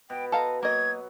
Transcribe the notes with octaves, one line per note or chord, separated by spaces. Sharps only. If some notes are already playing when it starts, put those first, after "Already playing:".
B2 G5
A4 D#5 F5 A#5
F#3 A#3 D#5 G#6